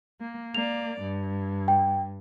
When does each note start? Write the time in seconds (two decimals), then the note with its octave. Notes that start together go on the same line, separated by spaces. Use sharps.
0.20 A#3
0.55 A#3 D5 F7
1.01 G2
1.68 G5